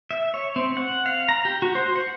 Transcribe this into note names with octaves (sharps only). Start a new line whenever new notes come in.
E5
C#5
C4
F#5
F5
A#5
G4
F#4
C5
F#5